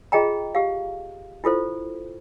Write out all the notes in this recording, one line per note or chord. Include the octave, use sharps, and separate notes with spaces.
F4 G#4 D#5 G5 A#5
G4 F5
E4 F4 A4 C5